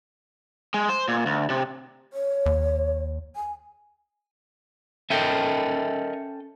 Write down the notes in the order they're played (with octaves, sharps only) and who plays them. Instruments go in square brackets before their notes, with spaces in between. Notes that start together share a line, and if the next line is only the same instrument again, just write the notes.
[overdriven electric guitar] G#3
C5
A#2
D2
C3
[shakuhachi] C#5
[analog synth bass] D#2
[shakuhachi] G#5
[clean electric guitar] C#4 A4 G5 [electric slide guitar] A#4 D#5 E5